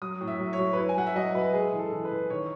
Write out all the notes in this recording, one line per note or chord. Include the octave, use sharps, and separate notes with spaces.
F#3 D#6
A2
E5
F#3
C#5
F#3
B4
E4 C#5
G#5
F#3 F#5
E5
F#3 D#5
F#3 B4
G#3 G#4
E3
A4
E3
B4
E3
D#3 C#5